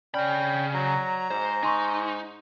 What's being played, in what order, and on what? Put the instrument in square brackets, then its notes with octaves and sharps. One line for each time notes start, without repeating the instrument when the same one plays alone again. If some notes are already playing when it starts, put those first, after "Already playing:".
[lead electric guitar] C#3 B5 [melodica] C#4 G5 [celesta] D5
[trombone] F#3 [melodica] A#5
[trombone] G#2 [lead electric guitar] C5
[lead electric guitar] D#4 [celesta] G#5 C6 C#6